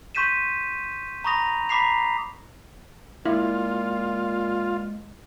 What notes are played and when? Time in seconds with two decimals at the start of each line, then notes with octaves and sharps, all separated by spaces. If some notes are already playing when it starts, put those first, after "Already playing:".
0.15 C6 C#6 G6 B6 D#7 E7
1.24 A#5 B5 C#6 D#6 A#6 F7
1.69 A#5 B5 D6 B6 C7 F7
3.25 A#2 G#3 E4 F4